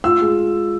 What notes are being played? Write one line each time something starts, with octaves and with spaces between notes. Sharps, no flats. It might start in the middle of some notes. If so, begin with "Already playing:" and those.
F4 E6
G#3